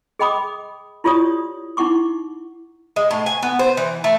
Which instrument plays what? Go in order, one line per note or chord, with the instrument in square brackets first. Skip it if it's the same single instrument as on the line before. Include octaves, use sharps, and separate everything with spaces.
[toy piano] G#4 D#5 G5 B5 D6 D#6
E4 F4 G4 C#5 D5 D#6
D#4 E4 F#5 C#6 D6
[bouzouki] G#3
A2
G#5
B3
C5
E3
A3